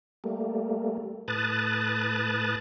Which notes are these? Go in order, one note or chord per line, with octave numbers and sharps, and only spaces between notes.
G3 A3 A#3
A2 B4 A5 D#6 F#6 A6